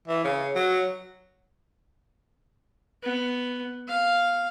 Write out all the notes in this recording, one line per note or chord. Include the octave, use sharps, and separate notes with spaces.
E3
C#3
F#3
B3
F5